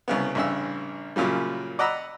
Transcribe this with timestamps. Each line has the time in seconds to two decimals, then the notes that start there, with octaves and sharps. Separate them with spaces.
0.08 C2 C#3 B3
0.35 A1 G2 C#3 E6
1.16 F#2 A#2 C#3 F#3 G3
1.79 D5 D#5 F#5 A#5 B5 E6